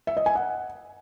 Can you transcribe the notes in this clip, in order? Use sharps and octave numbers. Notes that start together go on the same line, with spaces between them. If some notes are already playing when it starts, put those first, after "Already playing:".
E5
D#5
G#5
F#5